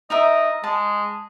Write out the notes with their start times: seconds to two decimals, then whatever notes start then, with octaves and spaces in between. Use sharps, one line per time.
0.10 D#4 A#4 D#5 E5
0.64 G#3 A5